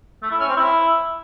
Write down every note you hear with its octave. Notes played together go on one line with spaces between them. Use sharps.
A3
E4
C#4
C4
E4